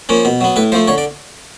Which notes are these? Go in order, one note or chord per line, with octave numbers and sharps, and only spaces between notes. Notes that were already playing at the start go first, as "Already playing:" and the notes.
F3 A#3 C#4
B2
F#3 B3
A2 B4
F3 A3 C5
D3 C#5
D5